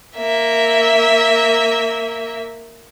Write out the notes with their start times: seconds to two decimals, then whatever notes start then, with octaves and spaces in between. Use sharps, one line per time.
0.17 A#3 E5